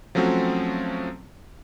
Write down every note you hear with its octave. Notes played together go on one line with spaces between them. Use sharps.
F3 F#3 A3 C4 C#4 F#4